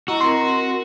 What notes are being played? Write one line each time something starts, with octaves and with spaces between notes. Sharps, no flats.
E4 F#4 D#5 A#5
C4 A#4 C6